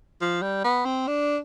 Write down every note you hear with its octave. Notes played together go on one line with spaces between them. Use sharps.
F3
G3
B3
C4
D4